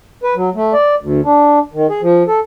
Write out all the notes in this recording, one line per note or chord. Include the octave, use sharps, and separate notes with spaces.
B4
F#3
A3
D5
D2
D4
D#3
G#4
F3
A4